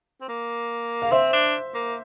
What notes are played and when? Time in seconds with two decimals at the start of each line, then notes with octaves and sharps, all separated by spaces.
0.21 C4
0.29 A#3
1.02 F5
1.12 C4 C5 E5
1.33 D4
1.74 A#3